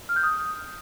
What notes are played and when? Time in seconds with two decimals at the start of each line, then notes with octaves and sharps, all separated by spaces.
0.09 F6
0.16 G6
0.23 D#6